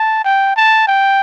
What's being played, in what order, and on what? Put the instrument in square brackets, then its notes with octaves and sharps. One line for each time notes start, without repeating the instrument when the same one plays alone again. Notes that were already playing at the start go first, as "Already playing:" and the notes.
Already playing: [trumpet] A5
G5
A5
G5